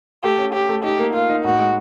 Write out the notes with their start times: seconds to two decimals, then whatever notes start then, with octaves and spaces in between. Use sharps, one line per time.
0.24 A3 G4
0.39 C#4
0.53 C#4 G4
0.69 A3
0.84 D#4 G4
0.99 A#3
1.14 A#3 F4
1.29 D#4
1.44 A2 F#4
1.59 G#3